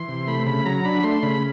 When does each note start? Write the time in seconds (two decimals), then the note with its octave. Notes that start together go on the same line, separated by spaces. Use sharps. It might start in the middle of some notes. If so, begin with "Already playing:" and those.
Already playing: E3 C6
0.08 C3
0.27 A3 B5
0.46 C#3 B5
0.65 F#3 A#5
0.85 D4 B5
1.03 A3 C6
1.23 C#3 B5